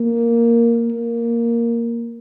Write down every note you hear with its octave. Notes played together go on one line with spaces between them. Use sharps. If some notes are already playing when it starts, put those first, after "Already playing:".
Already playing: A#3
A#3